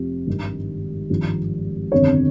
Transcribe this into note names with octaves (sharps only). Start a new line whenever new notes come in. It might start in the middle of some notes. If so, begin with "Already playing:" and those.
Already playing: F1 C3 F3
G#1 G2 D#3
G#1 G2 F3
G1 F2 C3 D#3 C#5